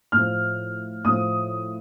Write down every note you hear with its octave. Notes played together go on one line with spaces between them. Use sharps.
A2 F3 F6
A2 F3 D#6